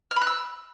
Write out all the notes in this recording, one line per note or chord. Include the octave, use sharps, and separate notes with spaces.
F6
B5
F#6
E6